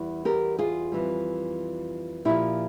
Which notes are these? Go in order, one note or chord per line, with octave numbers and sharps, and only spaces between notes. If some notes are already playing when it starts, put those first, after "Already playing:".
Already playing: E2 G3
G4 A#4
F4 G#4
F2 E3 G3
A#2 F3 E4 G4